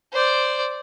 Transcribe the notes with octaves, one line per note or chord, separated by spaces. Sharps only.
C5 D5